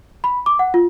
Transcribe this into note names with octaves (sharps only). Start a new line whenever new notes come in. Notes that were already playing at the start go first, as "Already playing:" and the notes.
B5
D6
F#5
F4